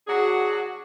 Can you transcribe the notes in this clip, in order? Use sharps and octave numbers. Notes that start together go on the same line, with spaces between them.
F#3 D4 F#4 G#4